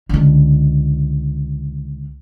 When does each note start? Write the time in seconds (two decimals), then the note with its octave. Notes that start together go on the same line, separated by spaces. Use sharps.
0.09 C#2 D3